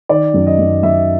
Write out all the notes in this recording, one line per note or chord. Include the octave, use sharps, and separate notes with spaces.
D#3 D5
F#2
D#5
F#2
F#2 E5